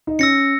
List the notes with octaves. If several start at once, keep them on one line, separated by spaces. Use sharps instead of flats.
D#4
C#4 E6 A#6 C#7